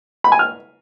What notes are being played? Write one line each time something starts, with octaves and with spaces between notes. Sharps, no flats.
B5
G#5
F6